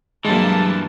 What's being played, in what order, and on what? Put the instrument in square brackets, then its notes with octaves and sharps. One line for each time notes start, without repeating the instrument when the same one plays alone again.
[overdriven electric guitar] G2 E3 [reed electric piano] F#3 G#3 [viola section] A#3 G4 A5